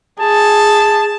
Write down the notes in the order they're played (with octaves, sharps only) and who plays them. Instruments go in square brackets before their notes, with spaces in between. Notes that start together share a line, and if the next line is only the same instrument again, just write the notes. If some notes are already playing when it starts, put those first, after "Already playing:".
[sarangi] G#4 [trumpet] A5